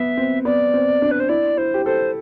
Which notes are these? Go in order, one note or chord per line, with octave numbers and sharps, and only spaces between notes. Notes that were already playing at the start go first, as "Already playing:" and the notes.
Already playing: B3 E5
C4
B3 D5
C4
D4
B4
C5
E4 D5
E4 C5
G4
A4 C5